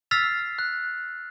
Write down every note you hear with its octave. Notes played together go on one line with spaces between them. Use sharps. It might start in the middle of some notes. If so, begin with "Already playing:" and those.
E6 F6 A6 B6 C7 F7
F#6